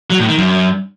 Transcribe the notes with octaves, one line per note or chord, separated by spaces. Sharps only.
F#3
A2
D#3
F#2